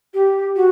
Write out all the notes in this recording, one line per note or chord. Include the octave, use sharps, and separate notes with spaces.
G4
F#4